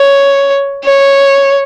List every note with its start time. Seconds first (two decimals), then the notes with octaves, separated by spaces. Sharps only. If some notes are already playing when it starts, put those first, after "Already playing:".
Already playing: C#5
0.84 C#5